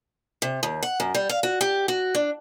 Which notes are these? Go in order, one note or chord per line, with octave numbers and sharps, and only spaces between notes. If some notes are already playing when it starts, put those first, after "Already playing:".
C3
D#2
F#5
F#2
G3
F5
F#4
G4
F#4
D4